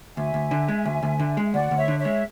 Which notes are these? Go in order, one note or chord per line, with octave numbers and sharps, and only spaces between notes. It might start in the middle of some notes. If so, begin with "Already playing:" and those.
D2 E5 G#5
D2
D3
G#3
D2
D2
D3
G#3
D2 D5 F#5
D2
C#5 E5
D3
C#5 E5
G#3